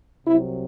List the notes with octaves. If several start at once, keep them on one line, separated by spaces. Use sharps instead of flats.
C2 C3 F#3 E4